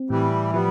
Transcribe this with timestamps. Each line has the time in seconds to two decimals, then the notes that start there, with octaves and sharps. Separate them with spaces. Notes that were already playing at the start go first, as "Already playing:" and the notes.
Already playing: C4
0.10 A2 E3 G3
0.54 F3 G3 B3